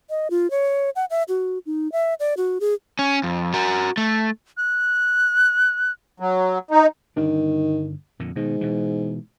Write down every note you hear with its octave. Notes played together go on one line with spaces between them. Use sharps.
D#5
F4
C#5
F#5
E5
F#4
D#4
E5
D5
F#4
G#4
C#4
F2
F#4 A#4
A3
F#6
F#3
D#4
G1 D#3 D4
F2 A#2 D3
G#2 B2 D#3
B2 E3